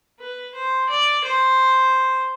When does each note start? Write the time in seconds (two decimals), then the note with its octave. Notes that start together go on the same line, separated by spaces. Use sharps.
0.20 B4
0.54 C5
0.89 D5
1.24 C5